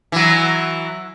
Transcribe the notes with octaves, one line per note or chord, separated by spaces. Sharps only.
E3 F#3